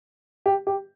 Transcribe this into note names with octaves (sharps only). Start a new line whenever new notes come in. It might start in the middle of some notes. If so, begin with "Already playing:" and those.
G4
G4